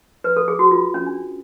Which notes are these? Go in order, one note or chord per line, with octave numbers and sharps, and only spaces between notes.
B4
A4
G#4
F#4
F4
C#4
D4